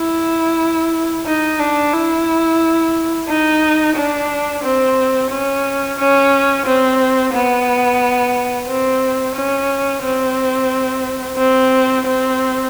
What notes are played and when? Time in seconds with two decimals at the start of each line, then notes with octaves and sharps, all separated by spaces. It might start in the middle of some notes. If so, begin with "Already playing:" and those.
Already playing: E4
1.26 D#4
1.60 D4
1.93 E4
3.29 D#4
3.95 D4
4.63 C4
5.31 C#4
5.98 C#4
6.66 C4
7.33 B3
8.68 C4
9.35 C#4
10.03 C4
11.37 C4
12.06 C4